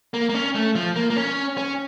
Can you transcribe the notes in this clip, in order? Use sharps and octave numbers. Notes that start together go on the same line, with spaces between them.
A#3
A#3
C#4
A3
F3
A#3
A#3
C#4
C#4